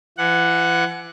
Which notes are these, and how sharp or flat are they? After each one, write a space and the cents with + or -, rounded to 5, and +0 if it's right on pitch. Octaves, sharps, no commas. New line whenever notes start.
E3 +40 F#5 +0